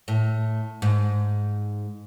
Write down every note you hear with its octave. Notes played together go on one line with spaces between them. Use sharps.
A2
G#2